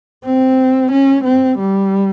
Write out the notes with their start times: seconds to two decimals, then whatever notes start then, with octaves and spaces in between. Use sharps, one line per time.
0.25 C4
0.92 C#4
1.24 C4
1.59 G3